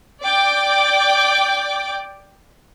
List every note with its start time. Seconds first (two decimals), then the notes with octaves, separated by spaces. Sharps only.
0.23 D5 G5 D6